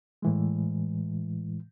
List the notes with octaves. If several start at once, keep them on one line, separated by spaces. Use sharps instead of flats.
A2 E3 G#3